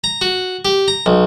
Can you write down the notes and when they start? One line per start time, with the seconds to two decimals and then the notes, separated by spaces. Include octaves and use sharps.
0.04 A#5
0.21 F#4
0.65 G4
0.88 A#5
1.06 B1